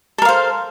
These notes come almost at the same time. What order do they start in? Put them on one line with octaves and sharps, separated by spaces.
A4 A#4 F5 C5